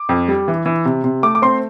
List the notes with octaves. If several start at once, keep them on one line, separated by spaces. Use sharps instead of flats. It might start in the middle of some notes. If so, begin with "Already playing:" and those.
Already playing: D6
F2
G3
E3
E3
C3
C3
A3 D6
D6
C4 C6